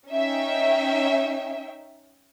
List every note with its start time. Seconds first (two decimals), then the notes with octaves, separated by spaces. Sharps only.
0.11 C#4 D#4 E5 G5